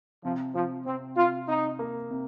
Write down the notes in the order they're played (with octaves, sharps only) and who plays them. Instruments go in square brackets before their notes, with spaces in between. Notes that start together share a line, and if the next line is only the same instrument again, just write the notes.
[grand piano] C3 [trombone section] F3
[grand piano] C3 [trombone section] F3
[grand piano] C3 [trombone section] C4
[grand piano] C3 [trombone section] F4
[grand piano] C3 [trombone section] D#4
[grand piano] A#3
C3